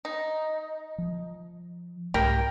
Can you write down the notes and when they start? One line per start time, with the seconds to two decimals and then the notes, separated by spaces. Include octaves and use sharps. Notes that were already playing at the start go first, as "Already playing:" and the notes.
0.05 D#4
0.98 F3
2.14 C2 G#2 A3 G4 A#4 G5